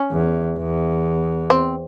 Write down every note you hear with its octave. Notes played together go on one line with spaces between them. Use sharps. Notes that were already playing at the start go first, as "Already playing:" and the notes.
Already playing: C#4
E2
E2
C4